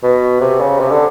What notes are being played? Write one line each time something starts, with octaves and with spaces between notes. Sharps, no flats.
B2
C3
C#3
C3
D3